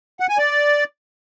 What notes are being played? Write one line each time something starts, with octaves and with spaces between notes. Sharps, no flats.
F#5
G#5
D5